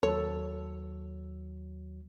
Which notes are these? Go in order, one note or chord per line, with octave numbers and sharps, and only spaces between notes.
D#2 F#3 A4 C#5